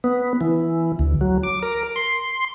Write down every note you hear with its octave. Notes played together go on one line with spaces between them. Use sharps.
B3
E3
D2
F#3
D6
A#4
C6